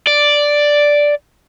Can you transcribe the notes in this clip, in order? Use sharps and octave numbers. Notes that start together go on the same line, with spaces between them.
D5